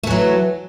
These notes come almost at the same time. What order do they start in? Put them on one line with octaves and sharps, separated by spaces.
A3 E3 F#3